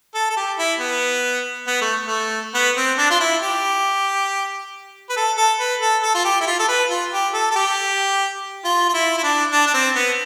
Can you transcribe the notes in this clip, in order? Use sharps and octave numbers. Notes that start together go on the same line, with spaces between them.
A4
A4
G4
E4
B3
B3
A3
A3
B3
C4
D4
F4
E4
G4
B4
A4
A4
B4
A4
A4
F4
G4
E4
F4
A4
B4
F4
G4
A4
A4
G4
F4
F4
E4
E4
D4
D4
D4
C4
B3